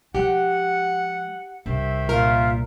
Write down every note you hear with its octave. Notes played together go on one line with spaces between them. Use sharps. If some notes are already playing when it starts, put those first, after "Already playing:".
F3 G#3 G4 F#5
C2 G2 D#3 C5 E5
A#2 F4 A#4